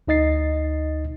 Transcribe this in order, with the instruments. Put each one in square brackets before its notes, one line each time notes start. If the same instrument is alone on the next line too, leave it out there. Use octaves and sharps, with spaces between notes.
[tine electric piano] D2 D#4 D#5 A6 C7